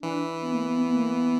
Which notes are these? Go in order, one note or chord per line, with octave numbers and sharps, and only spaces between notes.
E3 D4
B3
A#3
B3
B3
A#3
B3